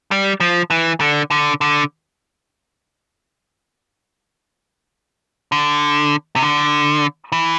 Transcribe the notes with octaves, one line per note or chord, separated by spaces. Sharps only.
G3
F3
E3
D3
D3
D3
D3
C3
D3
E3